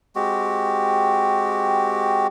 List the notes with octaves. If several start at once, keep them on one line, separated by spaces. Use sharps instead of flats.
G#3 C4 F#4 G4